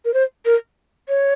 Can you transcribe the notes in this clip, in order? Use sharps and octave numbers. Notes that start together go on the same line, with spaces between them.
A#4
C5
A#4
C#5